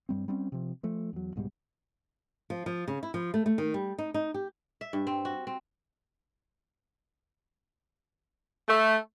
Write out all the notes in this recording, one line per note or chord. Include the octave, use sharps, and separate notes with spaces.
G2 G3 C4
G3 C4 C#4
C3 F3
F3 A3
E2 F#3
C2 G#2 B2 G3
F3
F3
C#3
E4
F3
A3
A3
D#3
G3
D#4
D#4
G4
E5
G2
C4
F#4
C4
A3